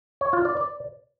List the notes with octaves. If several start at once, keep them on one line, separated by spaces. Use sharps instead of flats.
C#5
F4
D5
D5